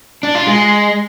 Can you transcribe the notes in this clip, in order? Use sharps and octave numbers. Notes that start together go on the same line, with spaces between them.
D4
F4
G#3